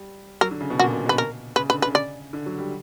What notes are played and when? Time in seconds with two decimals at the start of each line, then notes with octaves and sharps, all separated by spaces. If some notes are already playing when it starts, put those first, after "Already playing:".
Already playing: G3
0.41 F#3 A#4
0.51 D3
0.61 C#3
0.70 B2
0.79 A#2 F#4
0.93 B2
1.06 B2 B4
1.18 A#4
1.56 C#3 B4
1.70 D3 B4
1.82 C#3 B4
1.95 D5
2.33 D3
2.46 F#3
2.58 G3